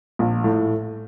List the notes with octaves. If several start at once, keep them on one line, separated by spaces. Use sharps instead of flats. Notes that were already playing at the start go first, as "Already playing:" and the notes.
A#1
A2